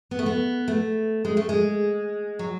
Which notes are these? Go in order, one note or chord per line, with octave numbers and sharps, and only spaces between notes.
B3
A3
B3
A3
G#3
A3
G#3
F#3